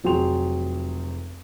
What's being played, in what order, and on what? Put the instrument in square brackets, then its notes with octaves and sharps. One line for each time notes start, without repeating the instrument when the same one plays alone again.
[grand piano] F1 F#3 G#4 G5 C6 F7